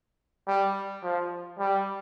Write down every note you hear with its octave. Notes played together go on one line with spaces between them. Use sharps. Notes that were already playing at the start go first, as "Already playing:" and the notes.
G3
F3
G3